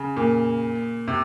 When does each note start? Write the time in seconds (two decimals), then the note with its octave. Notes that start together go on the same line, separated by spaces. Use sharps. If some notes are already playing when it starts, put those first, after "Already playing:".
Already playing: C#3
0.16 A#2
1.08 C3